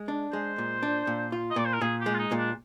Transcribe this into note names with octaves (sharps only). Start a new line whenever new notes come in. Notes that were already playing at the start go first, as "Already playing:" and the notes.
Already playing: G#3
D4
G#3 C5
A#2
D4
A#2
F4
D#5
A#2 D5
C5
A#4
A#2 G#4
G4
G#3
F4
D#4
A#2
D4